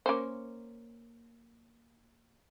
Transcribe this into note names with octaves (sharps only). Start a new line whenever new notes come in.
A#3 C#4 C5